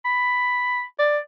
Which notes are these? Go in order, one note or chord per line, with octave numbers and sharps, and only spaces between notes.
B5
D5